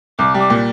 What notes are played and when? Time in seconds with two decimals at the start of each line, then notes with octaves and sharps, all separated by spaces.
0.18 C2 D6
0.34 G3
0.40 D6
0.50 A#2